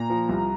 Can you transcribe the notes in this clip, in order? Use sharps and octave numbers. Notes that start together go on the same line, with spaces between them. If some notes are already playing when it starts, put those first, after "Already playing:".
Already playing: A#2 A#5
F3
C2